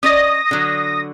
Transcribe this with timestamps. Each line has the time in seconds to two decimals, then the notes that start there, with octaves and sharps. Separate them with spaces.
0.03 C#4 D5 D#5 D#6 A#6
0.51 D3 F#3